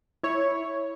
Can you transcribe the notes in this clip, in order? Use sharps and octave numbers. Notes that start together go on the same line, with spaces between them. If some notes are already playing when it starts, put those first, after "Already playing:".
E4 C#5